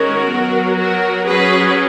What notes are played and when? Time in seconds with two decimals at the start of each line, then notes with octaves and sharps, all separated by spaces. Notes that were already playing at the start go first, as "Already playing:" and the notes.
Already playing: D#3 G#3 C#4 F#4 A#4
0.29 F#3 B3
0.77 F#4 A#4
1.25 F#3 C#4 G#4 B4